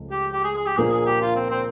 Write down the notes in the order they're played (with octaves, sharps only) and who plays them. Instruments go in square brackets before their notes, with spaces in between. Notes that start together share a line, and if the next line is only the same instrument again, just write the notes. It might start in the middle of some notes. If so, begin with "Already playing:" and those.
Already playing: [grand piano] C#2 F3 A3
[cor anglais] G4
G4
G#4
G#4
G4
[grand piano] A#2 F3 A#3 D4 [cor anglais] G#4
[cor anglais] G#4
G4
F4
C4
C4